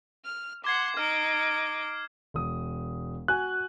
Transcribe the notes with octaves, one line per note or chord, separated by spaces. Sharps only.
F6
F#5 C6 D6 G#6 C7
D#4 F6 D7
E1 D#6
F#4 G#5 F#6